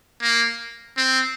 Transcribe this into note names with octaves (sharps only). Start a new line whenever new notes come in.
A#3
C4